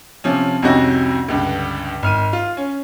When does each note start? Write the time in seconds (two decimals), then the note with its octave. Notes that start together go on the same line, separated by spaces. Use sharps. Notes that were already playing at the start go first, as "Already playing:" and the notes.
0.24 C3 F3 C#4
0.62 C2 F2 C3 C#4 D#4 F#4
1.28 C#2 G2 D3
2.03 G#1 F6 D#7
2.33 F4
2.57 C#4